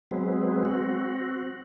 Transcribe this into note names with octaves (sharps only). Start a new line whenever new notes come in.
F#3 G#3 B3 C4
C4 F#4